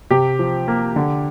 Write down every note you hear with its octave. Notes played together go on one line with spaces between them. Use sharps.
C3 G4
F3
A#3
D3